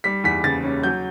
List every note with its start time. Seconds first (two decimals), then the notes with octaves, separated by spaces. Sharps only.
0.04 G3 B6
0.24 E2 B6
0.44 C#3 A6
0.64 C#4
0.83 F#3 G6